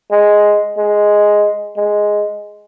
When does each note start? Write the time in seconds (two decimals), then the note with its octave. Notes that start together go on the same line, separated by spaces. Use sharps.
0.11 G#3
0.77 G#3
1.77 G#3